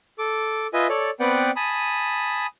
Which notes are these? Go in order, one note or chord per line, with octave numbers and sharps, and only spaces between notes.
A4 D6
F4 B4 D#5 E5 G#5
A4 C#5 D5
B3 C4 B4 D5 F#5 G5
G#5 A5 B5 D#6